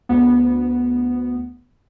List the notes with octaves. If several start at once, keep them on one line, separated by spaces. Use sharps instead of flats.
D2 B3